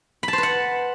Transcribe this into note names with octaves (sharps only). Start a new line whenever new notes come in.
B5
A5
C5
B4
F#5